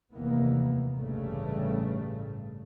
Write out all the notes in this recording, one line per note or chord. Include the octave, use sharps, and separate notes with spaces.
F1 D#2 E3 A#3 B3
A1 G2 C#3 A3